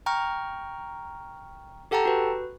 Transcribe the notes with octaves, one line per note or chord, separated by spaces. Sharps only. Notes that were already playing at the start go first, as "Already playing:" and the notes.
G5 A#5 C#6 F6
G4 A4 F#5 G5 A5 A#5
F#4 B4